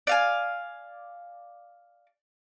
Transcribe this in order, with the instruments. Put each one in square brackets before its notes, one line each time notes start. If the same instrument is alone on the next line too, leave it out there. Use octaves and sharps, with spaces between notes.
[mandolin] D5 F5 G#5